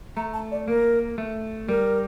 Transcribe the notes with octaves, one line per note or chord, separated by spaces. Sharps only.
A3 A#5
A5
D5
A#3 A#4
A3
G3 A#4